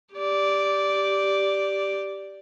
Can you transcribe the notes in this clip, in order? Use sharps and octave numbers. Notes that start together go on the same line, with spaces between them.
G4 D5